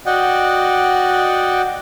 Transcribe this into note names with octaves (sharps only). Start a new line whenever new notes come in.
F#4 D5 D#5 F#5 G5